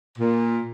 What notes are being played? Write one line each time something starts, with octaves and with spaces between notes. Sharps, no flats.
A#2